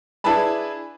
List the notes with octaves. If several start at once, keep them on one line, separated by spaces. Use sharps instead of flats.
D4 E4 G#4 B4 A5 B5